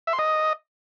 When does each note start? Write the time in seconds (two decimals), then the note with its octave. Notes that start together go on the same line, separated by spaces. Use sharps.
0.07 E5
0.13 C6
0.19 D#5